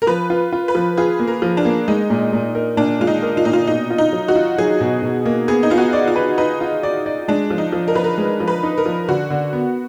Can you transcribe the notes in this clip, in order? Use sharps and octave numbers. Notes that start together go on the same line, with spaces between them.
A#4
F3 B4
F4
F4
B4
F3
F4 G#4
A#3
A#4
F3
D4
A#3
G#3 D#4
A#2
A#2
A#4
A#2 D4
G#3 F4
D#4
A#4
F4
A#2 D#4
F4
B2 D#4
F4
D#4
F#3
F#4
F4
F#3 G#4
B2
B2
A#3
B3 G#4
D#4
B3 F4
F#4
D5
F4
B4
D#4 B4
F4
D5
D5
G#3 D4
F3
D#4
F3
A#4
F3 B4
A#4
G#3
F3
B4
D#4
A#4
F3
D3 F#4
D3
B3